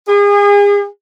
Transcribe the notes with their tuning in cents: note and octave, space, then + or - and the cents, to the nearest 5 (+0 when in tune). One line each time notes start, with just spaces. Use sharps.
G#4 -35